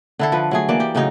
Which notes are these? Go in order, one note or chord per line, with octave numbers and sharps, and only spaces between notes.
D3 E4 A4
F3 B4
F#3 A3 G#4
E3 A#3 D5
G4
A2 C#3 F#3 D#4